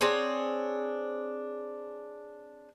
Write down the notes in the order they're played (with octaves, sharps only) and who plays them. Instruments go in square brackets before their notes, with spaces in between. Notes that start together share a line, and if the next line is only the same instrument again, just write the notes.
[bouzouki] C4 D4 G#4 C#5